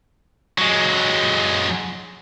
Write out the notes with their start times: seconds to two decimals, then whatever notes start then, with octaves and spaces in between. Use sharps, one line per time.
0.58 F#3 G#3